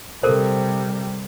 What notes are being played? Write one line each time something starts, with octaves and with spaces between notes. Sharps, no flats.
C3 G3 A4 A#4 C5